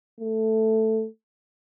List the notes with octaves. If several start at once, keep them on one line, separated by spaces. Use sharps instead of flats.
A3